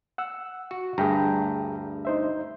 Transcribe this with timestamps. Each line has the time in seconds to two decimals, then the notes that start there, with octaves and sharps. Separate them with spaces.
0.18 F#5 E6
0.71 F#4
0.98 D2 G2 G#4 G5 A#5
2.05 D#4 C5 E5